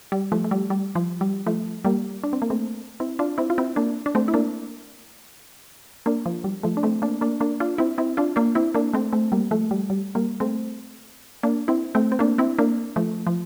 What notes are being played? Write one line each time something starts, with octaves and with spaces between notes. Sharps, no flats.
G3
F3 A3
A3
G3
G3
F3
G3
F3 A3
G3 A#3
D4
C4
A#3
A3 C4
C4 E4
D4 F4
C4 E4
F4
C4 E4
A#3 D4
D4
A3 C4
E4
A#3 D4
A#3 D4
F3
G3
F3 A3
D4
A3 C4
A#3 D4
A#3 D4
A#3 D4
D4 F4
C4 E4
C4 E4
D4 F4
A#3 D4
C4 E4
A#3 D4
A3 C4
A3 C4
G3 A#3
F3 A3
G3
G3
G3 A#3
A3 C4
A#3 D4
C4 E4
A3 C4
C4
A#3 D4
C4 E4
A#3 D4
F3 A3
F3